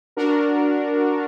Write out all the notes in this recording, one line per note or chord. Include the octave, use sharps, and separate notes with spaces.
D4 F#4 A#4